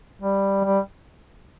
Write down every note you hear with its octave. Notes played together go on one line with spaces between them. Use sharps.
G3
G3